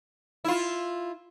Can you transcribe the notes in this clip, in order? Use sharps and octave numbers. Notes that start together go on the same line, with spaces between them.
E4 F4